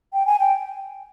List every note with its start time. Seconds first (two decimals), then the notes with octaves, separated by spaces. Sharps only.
0.13 G5
0.26 G#5
0.39 G5